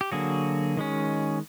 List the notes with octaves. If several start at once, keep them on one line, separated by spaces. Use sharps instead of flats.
G4
D3 F#3 A#3 F#4 G#4
D#3 G#3 C#4